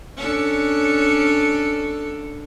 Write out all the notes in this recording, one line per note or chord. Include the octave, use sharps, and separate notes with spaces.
C#4 D4 A4